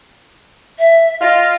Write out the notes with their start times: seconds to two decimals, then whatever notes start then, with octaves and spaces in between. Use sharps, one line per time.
0.79 E5
1.21 F4 D#5